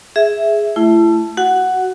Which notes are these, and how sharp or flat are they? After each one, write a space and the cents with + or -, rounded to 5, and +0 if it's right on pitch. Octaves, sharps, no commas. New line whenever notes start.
G#4 +0 E5 +0
A3 +0 E4 +35
F#4 +15 F#5 +0